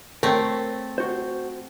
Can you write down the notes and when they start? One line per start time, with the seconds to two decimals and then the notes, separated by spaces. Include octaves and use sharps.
0.23 A3 C4 A#4 C#5 G5
0.98 F#4 C5